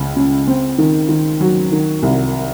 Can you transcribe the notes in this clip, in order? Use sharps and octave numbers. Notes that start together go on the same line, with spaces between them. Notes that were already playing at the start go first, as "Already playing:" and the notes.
Already playing: C#2
C#3
C4
D#3
D#3
F#3
D#3
C2